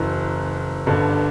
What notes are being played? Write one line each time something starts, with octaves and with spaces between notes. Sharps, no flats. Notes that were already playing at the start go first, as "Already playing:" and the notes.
Already playing: F#1 F#2 E3
G1 G2 D3